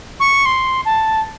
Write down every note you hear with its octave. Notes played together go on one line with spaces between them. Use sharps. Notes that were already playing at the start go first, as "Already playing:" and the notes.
C#6
C6
A5